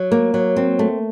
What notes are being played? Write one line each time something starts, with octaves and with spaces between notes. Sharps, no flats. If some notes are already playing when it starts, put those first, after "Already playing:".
Already playing: F#3
A#3
F#3
C4
A3